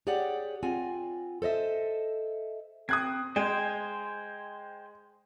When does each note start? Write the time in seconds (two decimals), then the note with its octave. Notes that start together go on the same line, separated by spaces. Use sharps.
0.07 G4 G#4 C#5 D5 F#5
0.63 C4 F4 F#5 G#5
1.42 A4 C5 D#5 E5
2.89 C4 D#6 F#6 G#6
3.36 G#3 C5 G5 G#5